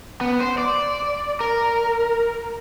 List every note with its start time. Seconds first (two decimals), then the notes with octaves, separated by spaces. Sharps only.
0.21 B3
0.40 C5
0.58 D5
1.41 A#4